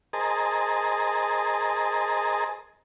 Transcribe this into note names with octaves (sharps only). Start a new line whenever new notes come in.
G#4 A#4 C5 D#5 A5